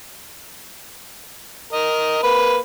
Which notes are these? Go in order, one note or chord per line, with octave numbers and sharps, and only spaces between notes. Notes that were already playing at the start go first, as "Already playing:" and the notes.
A#4 D#5
A#3 B4